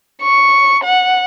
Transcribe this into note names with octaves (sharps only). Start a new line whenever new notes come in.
C#6
F#5